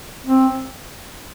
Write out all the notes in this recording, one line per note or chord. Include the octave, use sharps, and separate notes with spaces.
C4